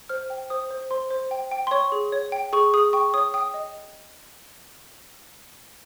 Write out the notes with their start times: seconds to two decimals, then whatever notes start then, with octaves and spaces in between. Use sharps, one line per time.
0.09 C5 F6
0.30 G5
0.50 C5 D#6
0.71 C5
0.91 C5 C6
1.11 C5
1.31 G5
1.51 G5
1.67 C6
1.71 C#5 C#6
1.92 G#4
2.12 C#5
2.32 G5
2.53 G#4 C#6
2.74 G#4 D#6
2.93 G5 C#6
3.14 C#5 D#6
3.34 G5 D#6
3.54 D#5